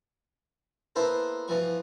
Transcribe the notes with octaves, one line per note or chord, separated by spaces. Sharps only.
A#3 B3 E4 A4 B4 C5
B2 E3 F3 C#6